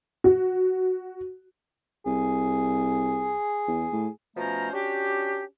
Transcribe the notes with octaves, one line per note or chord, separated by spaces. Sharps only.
F#4
C2 G#4
E2
A2
B2 F3 A3 C#4 C5 A#5
C#4 D4 F#4 G4